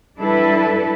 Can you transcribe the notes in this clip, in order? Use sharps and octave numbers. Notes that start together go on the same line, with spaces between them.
G3 D4 E4 A4 B4